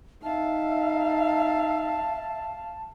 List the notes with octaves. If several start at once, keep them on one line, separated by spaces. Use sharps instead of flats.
D#4 E5 F5 A5